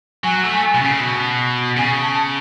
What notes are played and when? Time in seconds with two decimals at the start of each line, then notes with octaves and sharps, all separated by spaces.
0.24 F#3 G#5
0.44 A3
0.75 B2
0.81 C#3
1.01 B2
1.77 C#3 G#5
2.02 A5